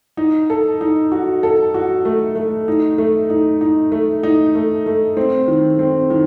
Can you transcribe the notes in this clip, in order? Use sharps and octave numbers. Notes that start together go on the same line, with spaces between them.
D#4
A4
D#4
F#4
A4
F#4
A3
A3
D#4
A3
D#4
D#4
A3
D#4
A3
A3
C4
D#3
C4
D#3